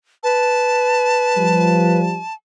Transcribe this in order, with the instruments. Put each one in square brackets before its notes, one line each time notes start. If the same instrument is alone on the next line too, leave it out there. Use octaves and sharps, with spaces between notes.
[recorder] B4 [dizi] A5
[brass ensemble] F3 G3